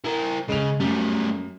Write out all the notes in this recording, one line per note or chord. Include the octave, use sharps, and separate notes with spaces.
E4 A#4
C#3 G#3 F7
F#2 G3 A3